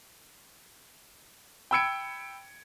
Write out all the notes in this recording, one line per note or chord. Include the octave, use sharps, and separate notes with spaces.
G5 B5 E6 G#6 C#7 D7